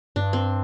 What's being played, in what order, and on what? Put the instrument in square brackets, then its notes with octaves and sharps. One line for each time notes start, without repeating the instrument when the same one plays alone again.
[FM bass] G2 [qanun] D4
[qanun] C4